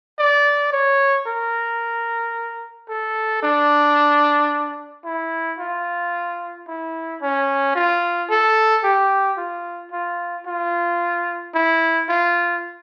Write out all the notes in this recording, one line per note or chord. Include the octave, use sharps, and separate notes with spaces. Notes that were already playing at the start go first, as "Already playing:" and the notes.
D5
C#5
A#4
A4
D4
E4
F4
E4
C#4
F4
A4
G4
F4
F4
F4
E4
F4